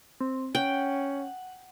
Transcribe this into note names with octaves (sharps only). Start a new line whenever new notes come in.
C4
C#4 F#5 G5